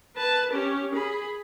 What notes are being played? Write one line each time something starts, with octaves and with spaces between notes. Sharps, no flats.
B4 A5
C#4 G4
G#4 B5